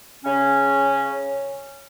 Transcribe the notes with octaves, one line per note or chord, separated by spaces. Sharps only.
C#3 C#4